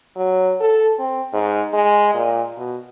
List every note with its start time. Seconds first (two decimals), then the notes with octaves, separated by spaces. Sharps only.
0.16 F#3
0.61 A4
0.99 C4
1.33 G#2
1.73 G#3
2.14 A#2
2.57 B2